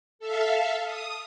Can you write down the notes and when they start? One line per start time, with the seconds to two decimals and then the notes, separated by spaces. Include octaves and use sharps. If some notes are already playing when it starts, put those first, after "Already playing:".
0.19 A4 E5 F5
0.85 D#6